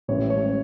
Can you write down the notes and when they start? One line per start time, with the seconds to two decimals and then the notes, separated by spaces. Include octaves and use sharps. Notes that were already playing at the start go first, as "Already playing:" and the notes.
0.08 A1 A2 G3 C#4 C#5
0.30 C#5